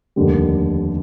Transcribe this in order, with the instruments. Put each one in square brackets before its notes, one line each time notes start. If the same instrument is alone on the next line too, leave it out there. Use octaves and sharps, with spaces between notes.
[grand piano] F1 D#2 D3 G3